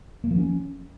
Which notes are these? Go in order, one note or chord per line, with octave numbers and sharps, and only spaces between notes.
A#3
F3
C#4